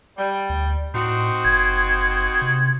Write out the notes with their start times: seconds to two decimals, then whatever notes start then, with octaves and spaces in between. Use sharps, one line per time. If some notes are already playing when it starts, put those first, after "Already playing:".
0.16 G3
0.49 D2
0.94 A2 C4 D#4 F#4
1.45 F#1 G#6
2.42 C3